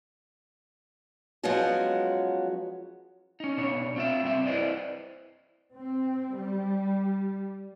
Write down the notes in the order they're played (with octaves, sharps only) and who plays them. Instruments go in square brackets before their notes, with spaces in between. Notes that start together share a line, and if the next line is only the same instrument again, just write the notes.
[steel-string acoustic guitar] F3 F#3 G#3 B3 C#4 F#4
[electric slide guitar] C#4 D#4
B2 D4 C#5
C4 F4 E5
G2 C4 E5
E4 B4 C5 D5 D#5
[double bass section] C4
G3